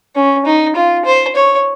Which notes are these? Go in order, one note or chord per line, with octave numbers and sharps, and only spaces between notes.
C#4
D#4
F4
C5
C#5